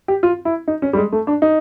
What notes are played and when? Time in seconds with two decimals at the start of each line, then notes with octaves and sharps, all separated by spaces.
0.08 G4
0.23 F4
0.45 E4
0.68 D#4
0.82 C#4
0.93 G3
0.97 G#3
1.12 A3
1.27 D4
1.42 D#4